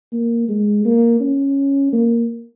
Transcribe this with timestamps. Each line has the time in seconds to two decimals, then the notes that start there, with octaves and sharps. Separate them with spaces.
0.12 A#3
0.48 G#3
0.85 A#3
1.20 C#4
1.93 A#3